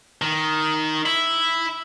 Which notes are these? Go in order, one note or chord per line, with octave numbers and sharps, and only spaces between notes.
D#3
E4